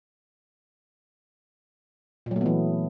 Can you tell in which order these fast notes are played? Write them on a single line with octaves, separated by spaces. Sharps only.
A#2 F#3 A3 B3 E3